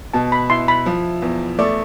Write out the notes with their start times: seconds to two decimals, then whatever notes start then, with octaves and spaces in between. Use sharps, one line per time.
0.14 B2 A5
0.32 B5
0.50 E4 C6
0.68 B5
0.86 F3
1.22 E2
1.59 A3 D5